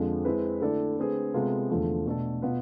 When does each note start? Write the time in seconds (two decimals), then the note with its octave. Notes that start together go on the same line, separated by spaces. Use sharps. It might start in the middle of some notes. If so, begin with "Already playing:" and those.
Already playing: F2 D3 F3 G#3
0.25 G#3 C4 E4 B4
0.61 D3 A3 E4 A4 D5
0.97 D3 A3 C4 G#4 B4
1.34 C3 G#3 B3 F4 A4
1.70 E2 D3 F3 A3
2.06 B2 A3 D4 A4
2.42 B2 B3 F4 B4